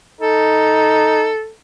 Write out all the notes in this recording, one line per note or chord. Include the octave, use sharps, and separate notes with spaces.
D#4 A4